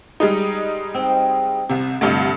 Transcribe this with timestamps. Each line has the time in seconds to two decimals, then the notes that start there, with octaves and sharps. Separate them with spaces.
0.20 G3 G#3 D#4
0.94 C4
1.69 C2 C3
2.01 D2 G2 C3 E4 F4 D#5